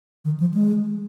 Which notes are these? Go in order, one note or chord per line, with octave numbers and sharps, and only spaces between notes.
D#3
F3
G#3